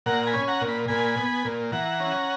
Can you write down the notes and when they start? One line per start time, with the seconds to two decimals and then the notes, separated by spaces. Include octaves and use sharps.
0.06 A#2 F#5 A#5
0.23 A#5
0.26 G#5 B5
0.33 C#4
0.48 F#5 A#5
0.61 A#2
0.68 B5
0.88 A#2 G#5 B5
1.17 B3
1.45 A#2
1.72 E3 F#5 A#5
2.00 C#4